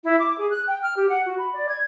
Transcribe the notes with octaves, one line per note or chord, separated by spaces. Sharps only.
E4
D6
G#4
F#6
G5
F6
G4
F#5
F#4
B5
D5
G#6